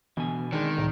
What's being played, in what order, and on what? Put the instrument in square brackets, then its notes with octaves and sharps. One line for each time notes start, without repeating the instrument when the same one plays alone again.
[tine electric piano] B2 [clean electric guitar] D3 G#5 [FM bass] E3
[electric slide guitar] D#3 [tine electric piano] G#3 D4
[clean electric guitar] C4
[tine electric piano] C2 [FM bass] A2